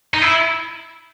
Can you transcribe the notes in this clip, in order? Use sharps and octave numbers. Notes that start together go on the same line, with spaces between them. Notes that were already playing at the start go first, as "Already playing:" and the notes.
D#4
E4